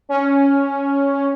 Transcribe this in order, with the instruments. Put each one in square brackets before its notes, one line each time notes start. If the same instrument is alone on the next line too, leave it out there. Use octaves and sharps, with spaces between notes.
[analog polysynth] C#4